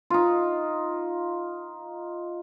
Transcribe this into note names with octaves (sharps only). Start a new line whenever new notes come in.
D#4 F4